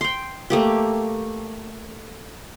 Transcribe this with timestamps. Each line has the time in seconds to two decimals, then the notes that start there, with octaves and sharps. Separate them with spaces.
0.01 G5 C6
0.50 A3 A#3 G4